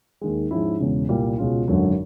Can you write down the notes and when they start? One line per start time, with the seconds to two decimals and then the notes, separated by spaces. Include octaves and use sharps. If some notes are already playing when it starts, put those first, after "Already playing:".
0.21 D#2 D#3 G#3
0.51 G#2 F3 G#3 C#4 E4
0.80 E1 E2 C#3
1.09 C2 A#2 G3
1.38 C#2 B2 G#3 C#4 F4
1.68 G#1 F#2 D3 F#3